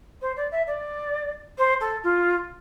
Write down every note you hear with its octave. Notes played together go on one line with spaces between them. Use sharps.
C5
D5
E5
D5
C5
A4
F4